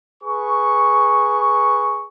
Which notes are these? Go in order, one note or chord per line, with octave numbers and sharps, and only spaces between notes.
G#4 B4 C#6